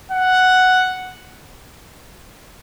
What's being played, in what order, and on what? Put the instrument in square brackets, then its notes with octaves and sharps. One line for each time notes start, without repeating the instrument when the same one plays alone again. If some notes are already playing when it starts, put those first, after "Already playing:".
[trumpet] F#5